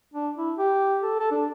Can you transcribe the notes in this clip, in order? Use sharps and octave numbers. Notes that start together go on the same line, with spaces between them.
D4
E4
G4
A4
A4
D4